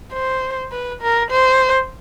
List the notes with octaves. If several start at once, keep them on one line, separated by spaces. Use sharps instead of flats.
C5
B4
A#4
C5